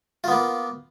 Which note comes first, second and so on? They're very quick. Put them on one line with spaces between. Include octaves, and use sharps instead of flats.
F4 B3 A#3